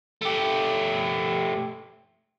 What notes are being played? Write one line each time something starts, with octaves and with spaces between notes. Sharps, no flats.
A3 G4